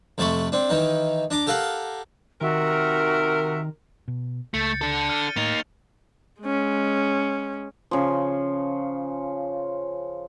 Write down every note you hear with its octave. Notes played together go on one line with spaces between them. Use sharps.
F2 C3 A3 A5 B5 C#6
C4 D4
D#3 E3 D#4
D4 A#5 D6
G4 A4 A#4 F5 F#5
C3 D#3 F#4 A#4 E5
B2
C#2 A3 G6 A6 C#7
D4 A4
F6 D#7 G7
A2 A#3 D#4 F7
G#3 C#4
C#3 F3